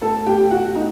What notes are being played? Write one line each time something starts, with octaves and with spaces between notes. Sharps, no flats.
A2 A4 A5
A2 G4 G5
A2 F#4 F#5
A2 D#4